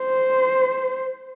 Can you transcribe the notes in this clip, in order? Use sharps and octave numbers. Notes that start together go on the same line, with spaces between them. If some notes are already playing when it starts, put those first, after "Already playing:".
Already playing: C5